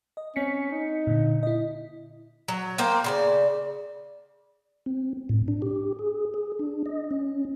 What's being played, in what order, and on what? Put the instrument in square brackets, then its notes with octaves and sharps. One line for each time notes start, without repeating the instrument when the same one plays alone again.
[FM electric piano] D#5
[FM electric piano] C4 B6 C#7 [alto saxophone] C#4
[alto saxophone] D#4
[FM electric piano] A#2 D3
E4 D#5
[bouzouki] F#3
A#3 C4 G5
C#3 C5 D5
[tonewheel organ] C4
A2
D4
G4
G#4
G#4
D4
D#5
C#4